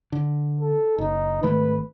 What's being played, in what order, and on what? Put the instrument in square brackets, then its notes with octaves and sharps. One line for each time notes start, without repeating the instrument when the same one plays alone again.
[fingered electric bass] D3
[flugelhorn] A4
[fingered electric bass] F#1 [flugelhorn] D#4
[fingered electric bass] G#1 D#3 A3 [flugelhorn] B4